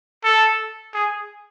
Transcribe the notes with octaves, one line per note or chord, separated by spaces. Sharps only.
A4
G#4